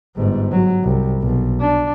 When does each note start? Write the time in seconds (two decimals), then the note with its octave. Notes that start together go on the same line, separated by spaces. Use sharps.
0.16 G1 G#2
0.52 F#3
0.83 C2
1.22 B1
1.60 D4